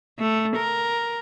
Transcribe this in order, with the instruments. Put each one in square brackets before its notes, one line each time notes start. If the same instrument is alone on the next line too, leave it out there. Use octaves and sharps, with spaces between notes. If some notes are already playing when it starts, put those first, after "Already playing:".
[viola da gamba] A3
A#4